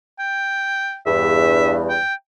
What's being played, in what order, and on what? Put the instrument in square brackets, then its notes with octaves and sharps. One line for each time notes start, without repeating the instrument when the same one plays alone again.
[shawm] G5
[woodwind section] E2 G2 [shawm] E5
[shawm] G5